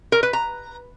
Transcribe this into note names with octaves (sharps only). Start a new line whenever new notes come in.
A#4
B4
A#5